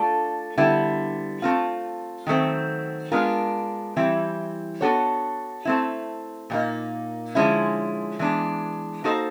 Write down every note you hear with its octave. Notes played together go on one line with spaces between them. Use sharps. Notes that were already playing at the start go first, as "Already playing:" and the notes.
Already playing: A3 D4 F4 A4 D5
D3 G3 B3 E4
A3 C4 F4
D#3 F#3 A3 C4
G#3 B3 D4 F4 A#4
E3 G3 C4 E4
B3 D4 F#4 A4 C#5
A3 C4 E4
A#2 G3 A#3 D#4
D3 F3 G#3 C#4 E4
E3 G#3 B3 D4
A#3 D#4 F#4 A4 C5